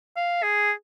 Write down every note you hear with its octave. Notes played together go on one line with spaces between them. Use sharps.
F5
G#4